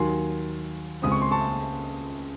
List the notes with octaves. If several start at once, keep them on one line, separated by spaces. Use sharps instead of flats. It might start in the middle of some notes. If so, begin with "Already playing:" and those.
Already playing: D#2 D#3 F#3 G#5 C6
C#2 C#3 G#3 C4 D#6
C#6
C6
A5 C#6